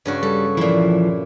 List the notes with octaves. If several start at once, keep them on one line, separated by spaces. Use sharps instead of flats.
G2 C#3 F#4
G3 A4
A#2 E3 F3 E4